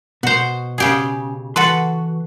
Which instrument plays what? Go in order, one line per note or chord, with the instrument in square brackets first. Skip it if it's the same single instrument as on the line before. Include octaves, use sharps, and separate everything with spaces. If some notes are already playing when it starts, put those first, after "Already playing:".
[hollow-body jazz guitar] B2 [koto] F#4 C5
[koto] C#3 G4 G#4
[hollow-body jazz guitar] E3 C6 [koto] F#4 A4 B4